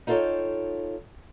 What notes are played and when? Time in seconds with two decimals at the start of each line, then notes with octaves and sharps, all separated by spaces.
0.07 D#4 F4 A4 C5 C#5 G5